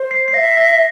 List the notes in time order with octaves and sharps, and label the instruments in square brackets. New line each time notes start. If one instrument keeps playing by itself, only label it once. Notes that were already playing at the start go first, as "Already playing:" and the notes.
Already playing: [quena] C5
[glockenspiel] C7
C7
[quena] E5 F5 [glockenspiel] A#6
[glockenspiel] A#6